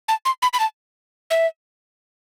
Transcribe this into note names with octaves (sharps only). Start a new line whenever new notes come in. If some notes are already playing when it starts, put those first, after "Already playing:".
A5
C6
B5
B5
A5
E5